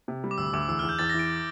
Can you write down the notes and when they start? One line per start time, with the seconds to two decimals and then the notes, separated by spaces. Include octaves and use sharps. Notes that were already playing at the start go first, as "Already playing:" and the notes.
0.08 C3
0.24 G3
0.31 D6
0.38 D2 E6
0.53 D2 D6
0.69 E2 E6
0.79 F6
0.83 E2
0.89 G6
0.99 E2 A6
1.10 A#6
1.14 E3 D7